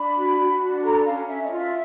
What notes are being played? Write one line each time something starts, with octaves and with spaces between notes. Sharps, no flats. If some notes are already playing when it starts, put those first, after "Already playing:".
Already playing: D4 B5
F#4
F#4
D4
A4 A#5
C#4 F5
C#4 E5
D#5
F4
E5